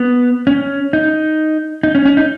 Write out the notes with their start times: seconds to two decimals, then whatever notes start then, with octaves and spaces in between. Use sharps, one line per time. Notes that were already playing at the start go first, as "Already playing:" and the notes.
Already playing: B3
0.47 C#4
0.93 D#4
1.83 D#4
1.95 C#4
2.05 C#4
2.17 D#4